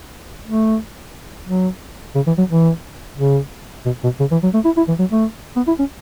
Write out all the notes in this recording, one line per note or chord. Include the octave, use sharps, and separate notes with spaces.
A3
F#3
C#3
E3
F#3
E3
C#3
B2
B2
C#3
E3
F#3
A3
E4
E4
E3
F#3
A3
B3
E4
C#4